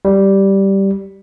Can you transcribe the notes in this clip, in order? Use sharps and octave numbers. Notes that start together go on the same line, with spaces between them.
G3